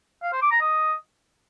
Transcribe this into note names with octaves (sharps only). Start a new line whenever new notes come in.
F5
C5
D6
A#5
D#5